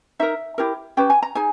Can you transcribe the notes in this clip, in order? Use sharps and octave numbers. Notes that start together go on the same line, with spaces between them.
D#4 A#4 E5
E4 G4 A#4
C#4 G4 B4 G5
G#5
A#5
D#4 G#4 G#5